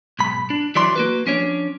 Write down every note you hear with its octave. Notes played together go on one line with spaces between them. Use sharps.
B1 G#2 B5
D4
E3 F#3 D5 C6
A#3 F#4 B4
F3 C#4 D4 C#5